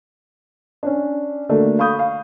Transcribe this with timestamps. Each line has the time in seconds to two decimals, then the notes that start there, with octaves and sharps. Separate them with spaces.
0.83 C#4 D4
1.49 D3 A3 A#3 D4 F#4
1.79 F5 B5 C#6 D#6 G6
1.99 F5